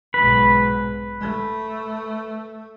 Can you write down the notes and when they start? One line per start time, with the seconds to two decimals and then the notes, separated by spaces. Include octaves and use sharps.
0.14 B1 G#2 B4
1.20 A3